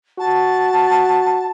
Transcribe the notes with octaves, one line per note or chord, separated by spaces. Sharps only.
F#4 A5